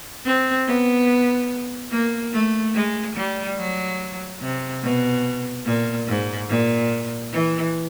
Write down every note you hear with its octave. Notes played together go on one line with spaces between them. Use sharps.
C4
B3
A#3
A3
G#3
G3
F#3
C3
B2
A#2
G#2
A#2
E3